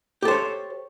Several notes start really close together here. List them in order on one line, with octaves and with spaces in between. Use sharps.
G4 A4 C5 C#5